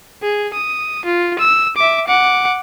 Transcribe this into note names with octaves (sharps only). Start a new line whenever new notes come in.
G#4
D#6
F4
E6
E5 D6
F#5 D6